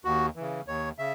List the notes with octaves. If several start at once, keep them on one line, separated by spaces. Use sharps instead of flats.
D#2 F#4
C#3 E3
D#2 C#5
C#3 E5